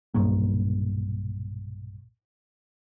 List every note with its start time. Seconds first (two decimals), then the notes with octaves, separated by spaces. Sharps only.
0.14 B1 G2 A#2